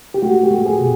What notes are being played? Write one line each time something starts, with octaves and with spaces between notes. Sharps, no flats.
G4
A3 F#4
G4
A3
G#4
B2